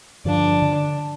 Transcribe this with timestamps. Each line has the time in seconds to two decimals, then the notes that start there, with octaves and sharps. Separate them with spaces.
0.25 G2 D3 F3 D4
0.62 D3